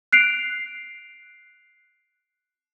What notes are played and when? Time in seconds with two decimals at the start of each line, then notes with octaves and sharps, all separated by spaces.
0.12 F#6 C7 D7 F7